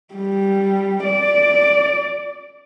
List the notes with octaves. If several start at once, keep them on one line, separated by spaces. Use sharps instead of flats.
G3
D5